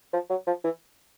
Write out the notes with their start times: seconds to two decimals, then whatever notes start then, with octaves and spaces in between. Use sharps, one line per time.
0.13 F3
0.30 F#3
0.47 F3
0.64 E3